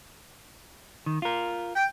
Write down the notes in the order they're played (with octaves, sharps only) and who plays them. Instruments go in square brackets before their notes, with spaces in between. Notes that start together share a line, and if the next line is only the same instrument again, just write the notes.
[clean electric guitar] D#3
F4 A#4
[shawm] G5